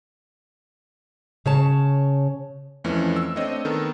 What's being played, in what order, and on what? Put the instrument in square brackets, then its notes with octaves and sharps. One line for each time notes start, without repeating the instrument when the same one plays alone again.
[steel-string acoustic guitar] C#3 C#5 A5
[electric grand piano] F2 E3 A3 C#4
E6
A3 C4 D4 C#5 D#5
D#3 B3 A4 A#4